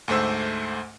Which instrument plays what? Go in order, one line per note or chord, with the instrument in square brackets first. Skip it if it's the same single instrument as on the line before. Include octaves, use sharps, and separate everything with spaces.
[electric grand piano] D2 G#2 A3 C5 E6